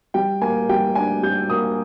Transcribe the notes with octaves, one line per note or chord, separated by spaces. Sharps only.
G3 G5
A#3 G#5
G3 G5
D4 G#5
G3 G6
A#3 D#6